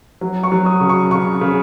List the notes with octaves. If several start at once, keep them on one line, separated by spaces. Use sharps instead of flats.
F#3
C#6
F#3
D#6
C#3
C#6
C#3 C#6
C#3